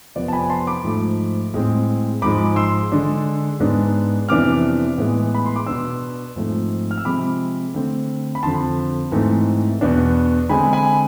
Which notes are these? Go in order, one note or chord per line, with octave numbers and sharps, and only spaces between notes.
F2 C3 F3 B3 D5
A5
G#5 B5
A5 C6
B5 D6
G#2 F3 A3
A2 G#3 C4
G#2 F3 G#3 B5 D6
C6 E6
D3 G#3 D4
G#2 G#3 B3 D4
F2 C3 E3 B3 D4 D6 F6
A2 E3 G#3 B3
B5
C6
D6
B2 B3 D4 C6 E6
G#2 F3 A3 C4
F6
E6
C3 F3 G#3 C4 B5 D6
D3 A3 C4
B5
F2 D3 F3 A5 C6
G#2 E3 A3 C4
E2 B2 B3 D4
D3 G#3 C4 G#5 B5
G#5 B5